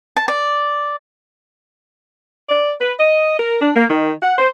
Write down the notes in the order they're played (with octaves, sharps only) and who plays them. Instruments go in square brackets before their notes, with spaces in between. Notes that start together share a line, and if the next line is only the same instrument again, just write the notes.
[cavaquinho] A5
D5
[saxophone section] D5
B4
D#5
A#4
D4
A#3
D#3
F#5
C5